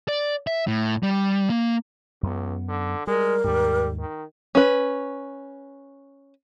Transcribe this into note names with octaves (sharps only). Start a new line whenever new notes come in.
D5
E5
A2
G3
A#3
C#2 F#2 B3
D3
G3 G#3 A#4
D#2 G#2 G3
D#3
C#4 B4